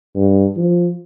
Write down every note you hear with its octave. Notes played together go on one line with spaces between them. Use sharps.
G2
F3